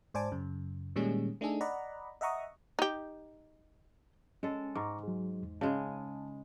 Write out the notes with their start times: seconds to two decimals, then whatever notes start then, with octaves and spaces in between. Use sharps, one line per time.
0.14 G#2 C5 D5 G#5 A5 D6
0.32 F#2 C#3
0.96 A#2 D#3 G3 G#3 C#4 G#4
1.41 A3 D4 D#4 G#4 A4
1.61 D5 D#5 F#5 A#5 B5
2.21 D#5 E5 F#5 A#5 C#6 D#6
2.79 D#4 G4
4.43 G#3 C#4 A4
4.75 G#2 A#5 C#6 D6
5.03 F#3 G#4
5.42 E2
5.61 C#3 G#3 G#4 A5